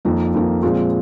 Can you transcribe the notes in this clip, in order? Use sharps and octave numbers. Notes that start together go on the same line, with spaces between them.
F2 D#3 A#3 F4
F2 D#3 A#3 F4
A#2 F3 G#3 C4 F4